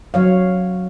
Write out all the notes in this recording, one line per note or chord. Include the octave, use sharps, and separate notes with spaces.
F#3 C#5 F5